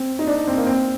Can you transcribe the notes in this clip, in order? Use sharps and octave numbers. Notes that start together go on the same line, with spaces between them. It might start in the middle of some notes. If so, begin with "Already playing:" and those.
Already playing: C4
D#4
D4
C4
A#3
C4